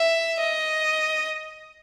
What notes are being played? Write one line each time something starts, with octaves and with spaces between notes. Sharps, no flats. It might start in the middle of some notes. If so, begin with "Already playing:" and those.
Already playing: E5
D#5